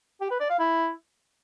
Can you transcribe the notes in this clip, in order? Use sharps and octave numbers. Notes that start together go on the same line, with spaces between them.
G4
B4
D5
F5
E4